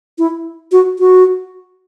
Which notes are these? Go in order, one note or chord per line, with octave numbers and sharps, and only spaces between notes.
E4
F#4
F#4